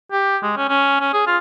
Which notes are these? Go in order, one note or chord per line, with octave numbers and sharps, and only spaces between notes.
G4
G#3
C#4
C#4
C#4
G#4
F4